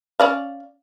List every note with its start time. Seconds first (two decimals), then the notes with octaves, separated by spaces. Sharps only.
0.20 C#4 D5 F5